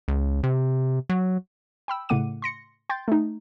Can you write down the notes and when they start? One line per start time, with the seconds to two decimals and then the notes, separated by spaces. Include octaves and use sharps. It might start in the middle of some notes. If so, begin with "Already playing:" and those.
0.08 C#2
0.44 C3
1.09 F#3
1.88 G5 B5 E6
2.09 A2 C#3 A3 F#5 D6 D#7
2.42 C6 A#6 C#7
2.89 G5 C6 G6 A6
3.08 A3 D#4